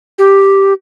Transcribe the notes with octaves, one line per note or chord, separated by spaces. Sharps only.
G4